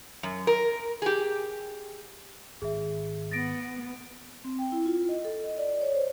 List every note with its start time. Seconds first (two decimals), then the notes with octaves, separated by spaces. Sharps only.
0.23 F#2
0.47 A#4
1.02 G4 G#4
2.62 G#1 G#4 E5
3.31 B3 A6 A#6 D7
4.45 C4
4.59 G5
4.72 E4
4.86 F4
5.09 D#5
5.25 A4
5.44 D#5
5.58 D5
5.82 C#5
5.95 C5